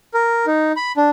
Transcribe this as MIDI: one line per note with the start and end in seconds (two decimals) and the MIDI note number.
0.14 0.46 70
0.46 0.72 63
0.77 0.92 83
0.97 1.10 62